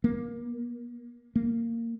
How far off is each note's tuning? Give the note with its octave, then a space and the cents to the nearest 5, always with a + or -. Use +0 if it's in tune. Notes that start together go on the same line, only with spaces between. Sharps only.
A#3 +25
A#3 -15